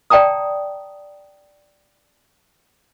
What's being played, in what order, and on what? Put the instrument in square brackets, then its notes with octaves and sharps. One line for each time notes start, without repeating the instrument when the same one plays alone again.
[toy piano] D5 G5 A5 A#5 D#6